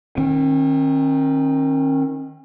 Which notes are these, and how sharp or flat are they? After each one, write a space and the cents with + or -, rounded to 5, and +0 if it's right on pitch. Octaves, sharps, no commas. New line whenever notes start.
D#3 +0 C#4 -45